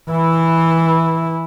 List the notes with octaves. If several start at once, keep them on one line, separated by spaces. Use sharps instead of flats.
E3 E4